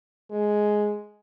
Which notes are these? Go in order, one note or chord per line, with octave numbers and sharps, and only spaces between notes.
G#3